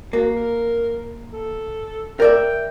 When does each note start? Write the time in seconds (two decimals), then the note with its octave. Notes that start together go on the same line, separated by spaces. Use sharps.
0.13 A#3 F#4
0.35 A#4
1.32 A4
2.20 A#4 D5 E5 G5